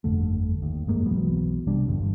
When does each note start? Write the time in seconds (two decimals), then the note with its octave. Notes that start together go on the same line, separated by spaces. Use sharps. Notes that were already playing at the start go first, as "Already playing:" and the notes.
0.04 G1 F2 D3 A3
0.62 D#2
0.87 F1 G2 G#3 A#3
1.06 B1 E3 F#3 B3
1.67 B1 C3 G3 D4
1.89 G1 E2 G2 D3